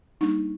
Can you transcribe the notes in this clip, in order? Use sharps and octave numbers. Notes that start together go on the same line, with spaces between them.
G3 A#3 D4 D#4